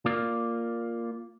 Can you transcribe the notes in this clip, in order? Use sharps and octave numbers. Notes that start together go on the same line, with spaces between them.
A#3 F4 D5